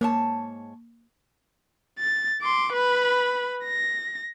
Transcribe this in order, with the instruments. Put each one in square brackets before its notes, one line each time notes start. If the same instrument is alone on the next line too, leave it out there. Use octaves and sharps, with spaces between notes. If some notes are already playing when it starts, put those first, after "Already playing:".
[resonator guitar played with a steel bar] G#2 C#5 A5 [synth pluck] A#3
[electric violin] A6
C6 D6
B4 B5
A#6